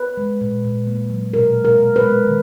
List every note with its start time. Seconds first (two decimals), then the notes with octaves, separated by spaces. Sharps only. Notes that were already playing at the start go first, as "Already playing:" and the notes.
Already playing: B4
0.17 G#3
0.41 A#2
0.64 A#2
0.87 A#3
1.10 F#3
1.34 B2 A#4
1.57 G#3
1.65 A#4
1.80 B2
1.96 B4
2.03 G#3
2.26 D#3